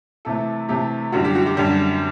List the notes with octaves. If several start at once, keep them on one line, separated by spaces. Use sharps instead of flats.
C3 E3 A3 A4
C3 E3 A3 G4
F#2 D3 G3 F#4
G4
F#4
G4
F#2 D3 G3